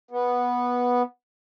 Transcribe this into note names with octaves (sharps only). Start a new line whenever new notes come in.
B3